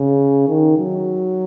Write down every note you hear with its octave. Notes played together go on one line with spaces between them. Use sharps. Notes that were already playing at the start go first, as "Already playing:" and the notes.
Already playing: C#3
D#3
F#3